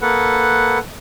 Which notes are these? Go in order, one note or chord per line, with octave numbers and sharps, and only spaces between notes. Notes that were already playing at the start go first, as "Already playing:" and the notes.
A#3 A4 B4 F#5